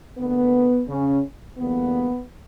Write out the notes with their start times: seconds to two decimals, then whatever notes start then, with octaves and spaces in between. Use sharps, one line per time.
0.18 D2 D3 A#3 B3
0.88 C#3 C#4
1.58 E2 D3 G3 A#3 B3